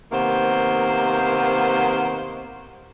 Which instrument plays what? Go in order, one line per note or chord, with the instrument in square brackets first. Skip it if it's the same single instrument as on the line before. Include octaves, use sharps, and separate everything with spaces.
[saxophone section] C3 D#3 A#3 B3 C5